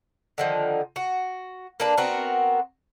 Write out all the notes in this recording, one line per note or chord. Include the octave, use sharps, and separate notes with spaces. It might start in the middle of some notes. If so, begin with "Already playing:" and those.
D3 D#3 F3
F#4
A#3 D4 B4
B3 C4 F#4 A#4